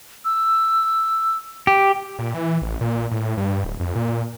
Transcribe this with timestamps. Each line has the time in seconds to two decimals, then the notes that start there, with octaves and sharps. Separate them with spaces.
0.25 E6
1.67 G4
2.19 A#2
2.34 E3
2.62 A1
2.81 A#2
3.11 A2
3.37 G2
3.64 D1
3.80 F2
3.95 A#2